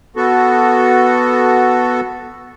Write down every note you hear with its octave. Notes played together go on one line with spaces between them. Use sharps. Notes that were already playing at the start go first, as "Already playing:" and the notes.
B3 F#4 A4